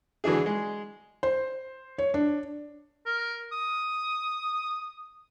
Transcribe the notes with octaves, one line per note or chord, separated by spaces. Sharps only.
D3 E3 F#3 D4 G#4
G#3
C5
C#5
D4
A#4
D#6